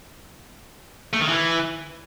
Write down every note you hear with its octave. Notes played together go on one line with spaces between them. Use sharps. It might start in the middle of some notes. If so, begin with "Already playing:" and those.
A3
D#3
E3